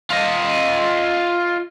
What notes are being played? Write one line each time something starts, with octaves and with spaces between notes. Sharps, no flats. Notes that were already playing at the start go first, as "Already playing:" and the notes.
F4 D#5